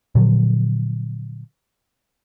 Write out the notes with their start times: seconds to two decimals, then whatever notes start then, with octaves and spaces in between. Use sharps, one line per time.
0.15 A#2 D3 F3 F#3